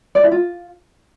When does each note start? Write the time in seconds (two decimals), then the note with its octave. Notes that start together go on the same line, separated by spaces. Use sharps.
0.15 D5
0.23 E4
0.31 F4